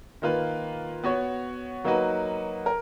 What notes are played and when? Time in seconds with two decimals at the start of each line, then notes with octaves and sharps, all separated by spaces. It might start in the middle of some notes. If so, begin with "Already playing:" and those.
0.22 D#3 A#3 F4 B4
1.04 B3 F#4 C#5
1.84 F#3 A#3 D#4 F#4 B4
2.66 A#4